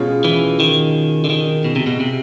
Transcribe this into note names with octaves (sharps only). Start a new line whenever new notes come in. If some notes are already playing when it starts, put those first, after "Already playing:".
Already playing: B2 G#3 C#4 F4 G#4
E3
D#3
D3
D#3
B2
C3
B2
C3